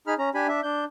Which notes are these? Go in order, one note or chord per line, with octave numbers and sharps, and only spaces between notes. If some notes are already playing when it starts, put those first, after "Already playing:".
D#4 G#4 B5 F6
C#4 A#5
D4 G4 G#5 B5
D4 E5
D4 G6